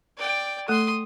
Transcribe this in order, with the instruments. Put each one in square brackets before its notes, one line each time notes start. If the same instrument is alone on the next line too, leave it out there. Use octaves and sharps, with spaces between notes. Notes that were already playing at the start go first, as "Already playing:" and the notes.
[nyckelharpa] D5 G5
[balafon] A3 A4 [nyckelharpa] C6 D#6